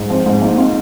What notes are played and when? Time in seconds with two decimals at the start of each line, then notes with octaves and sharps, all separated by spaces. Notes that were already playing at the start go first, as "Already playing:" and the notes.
Already playing: G#2 G#3
0.10 F3 C4
0.26 G#2 G#3
0.41 F3 A#3 D#4
0.57 C4 F4